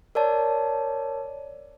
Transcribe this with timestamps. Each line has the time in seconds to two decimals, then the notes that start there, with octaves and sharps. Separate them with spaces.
0.15 A#4 C#5 D5 A5